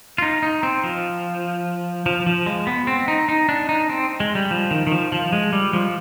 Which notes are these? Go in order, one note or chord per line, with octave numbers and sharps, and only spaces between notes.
F4
D#4
D#4
C4
F3
F3
F3
G#3
B3
C4
D#4
D#4
D4
D#4
C4
G#3
G3
F3
D#3
D#3
F3
F3
G#3
G3
F3